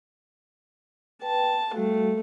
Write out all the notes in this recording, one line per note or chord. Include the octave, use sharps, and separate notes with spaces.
B4 G5 A5
G3 A3 F#4 F5